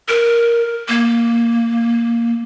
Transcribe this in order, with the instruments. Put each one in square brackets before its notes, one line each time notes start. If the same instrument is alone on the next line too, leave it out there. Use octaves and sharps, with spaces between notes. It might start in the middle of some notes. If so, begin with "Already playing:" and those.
[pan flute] A#4
A#3